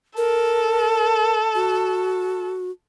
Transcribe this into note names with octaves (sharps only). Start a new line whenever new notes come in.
A4 A#4
F#4